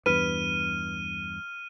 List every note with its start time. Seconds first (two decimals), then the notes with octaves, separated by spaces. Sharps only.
0.06 E2 G2 B4 F6 D#7